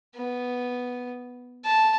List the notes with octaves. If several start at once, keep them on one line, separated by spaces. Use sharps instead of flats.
B3
A5